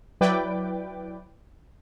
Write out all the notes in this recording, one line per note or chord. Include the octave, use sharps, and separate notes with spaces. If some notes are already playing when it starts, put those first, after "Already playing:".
F#3 E4 B4 D5 G5 D6